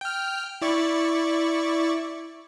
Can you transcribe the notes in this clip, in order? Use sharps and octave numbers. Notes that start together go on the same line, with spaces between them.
G5 F6
E4 D5 C#6